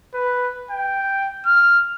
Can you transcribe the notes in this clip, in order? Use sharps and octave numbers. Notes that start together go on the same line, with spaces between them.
B4
G5
F6